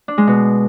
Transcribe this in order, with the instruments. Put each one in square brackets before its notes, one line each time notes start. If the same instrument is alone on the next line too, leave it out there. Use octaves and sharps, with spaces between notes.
[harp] D4
G#3
B2